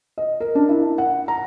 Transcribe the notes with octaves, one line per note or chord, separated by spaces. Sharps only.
D#5
A#4
D4
E4
F#5
A#5